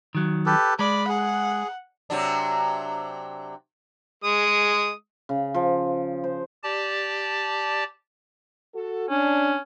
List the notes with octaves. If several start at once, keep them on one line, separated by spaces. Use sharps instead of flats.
D#3 F#3
G4 A4 B4
G#3 D5 B5
G#4 F#5
C3 F#3 D4
G#3 D#6
C#3
F3
C5
G4 D5 A5
F#4 A4
C#4 D4